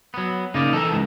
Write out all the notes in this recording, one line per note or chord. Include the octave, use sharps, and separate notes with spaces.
F#3 B3
C#3 A#3 D#4 D5
E3 A4 A#4
C#2 G#2